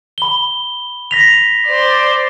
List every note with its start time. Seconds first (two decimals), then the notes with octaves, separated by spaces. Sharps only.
0.18 B5 G7
1.11 A#6 B6 F7
1.66 C5 D5